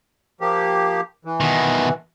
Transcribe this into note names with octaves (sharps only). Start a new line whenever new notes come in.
F3 A#3 G4
E3
B2 D#3